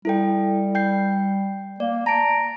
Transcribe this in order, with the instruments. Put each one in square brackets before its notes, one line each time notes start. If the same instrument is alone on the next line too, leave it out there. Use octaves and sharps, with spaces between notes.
[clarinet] G3 [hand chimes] E4 A4 G5
[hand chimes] G5 G6 C7
[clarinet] A#3 [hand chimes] D5
[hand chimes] A5 D7 [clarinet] A#5